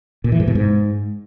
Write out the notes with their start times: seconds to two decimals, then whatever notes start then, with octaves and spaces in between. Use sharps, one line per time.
0.24 A#2
0.32 E3
0.40 G#2
0.48 B2
0.55 G#2